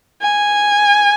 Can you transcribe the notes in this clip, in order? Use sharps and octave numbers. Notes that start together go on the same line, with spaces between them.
G#5